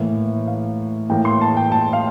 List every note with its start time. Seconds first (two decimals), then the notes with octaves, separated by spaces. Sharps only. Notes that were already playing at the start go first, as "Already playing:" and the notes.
Already playing: A2 E3 A#3
0.47 F5
1.10 A2 E3 A#3 G5
1.25 C6
1.41 A5
1.57 G5
1.72 A5
1.93 F5